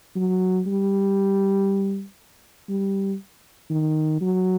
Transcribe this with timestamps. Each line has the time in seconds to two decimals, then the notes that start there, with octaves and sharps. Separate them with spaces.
0.16 F#3
0.67 G3
2.69 G3
3.70 D#3
4.21 F#3